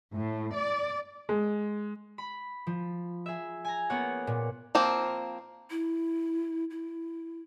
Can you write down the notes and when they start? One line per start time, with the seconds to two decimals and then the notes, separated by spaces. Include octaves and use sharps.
0.14 A2
0.54 D5
1.29 G#3
2.18 B5
2.67 F3
3.26 G#4 E5
3.65 G#5 A#5
3.90 A#3 B3 C#4 C#5 F#5
4.27 A#2
4.75 F3 A#3 C4
5.70 E4
6.70 E4